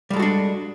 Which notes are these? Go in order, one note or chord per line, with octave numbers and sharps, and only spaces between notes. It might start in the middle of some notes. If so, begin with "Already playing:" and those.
G3 G#3 D4 F#4 A4